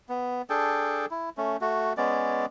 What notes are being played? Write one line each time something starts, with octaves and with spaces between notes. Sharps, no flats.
B3
D4 G#4 A4 G5
E4
A3 C#4
A3 F#4
G#3 B3 C#4 D5